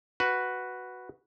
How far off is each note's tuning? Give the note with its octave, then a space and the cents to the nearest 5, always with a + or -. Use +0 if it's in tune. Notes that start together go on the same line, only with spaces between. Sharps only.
F#4 +0 B4 +0